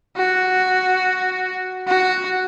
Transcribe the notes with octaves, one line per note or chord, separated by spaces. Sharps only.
F#4
F#4